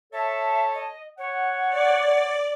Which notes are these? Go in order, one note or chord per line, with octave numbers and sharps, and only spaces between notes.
A4 C#5 E5 A5
D#5
C#5 F#5
D5